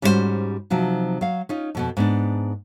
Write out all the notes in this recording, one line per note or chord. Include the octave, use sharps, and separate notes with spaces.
G#2 G3 C#4 F#4 G4 C5
C3 F3 F#3 D#4
F#3 F5
C#4 D#4 F4
F2 B2 B3
G#2 B3 D4